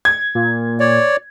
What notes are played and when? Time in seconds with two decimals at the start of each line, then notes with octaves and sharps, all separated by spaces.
0.05 G#6
0.35 A#2
0.80 C#5 D5